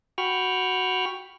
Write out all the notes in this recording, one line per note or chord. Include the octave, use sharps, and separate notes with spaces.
F#4 G5 B5 C#6 F6